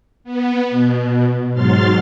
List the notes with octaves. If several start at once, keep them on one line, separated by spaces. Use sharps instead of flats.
B3
B2
G#2 F#3 C6 F6 A6